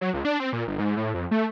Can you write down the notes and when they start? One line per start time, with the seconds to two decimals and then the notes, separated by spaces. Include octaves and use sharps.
0.01 F#3
0.14 C#2
0.25 D4
0.40 C4
0.53 A#2
0.67 G1
0.79 G#2
0.97 A2
1.14 F2
1.31 A3